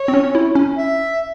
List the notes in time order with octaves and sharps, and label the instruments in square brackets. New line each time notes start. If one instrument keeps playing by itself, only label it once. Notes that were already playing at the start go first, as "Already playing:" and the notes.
Already playing: [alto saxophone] C#5
[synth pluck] C4
C#4
E4
C#4
[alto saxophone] E5